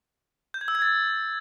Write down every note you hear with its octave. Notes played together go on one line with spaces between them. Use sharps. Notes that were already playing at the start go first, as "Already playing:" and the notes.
G6
G#6
E6
G#6
A6